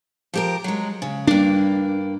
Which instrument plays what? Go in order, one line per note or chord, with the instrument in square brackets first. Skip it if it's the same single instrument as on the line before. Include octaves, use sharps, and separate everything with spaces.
[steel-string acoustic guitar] F3 G4 A#4
F#3 G#3
C#3
[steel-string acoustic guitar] G2 A#3 [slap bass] D4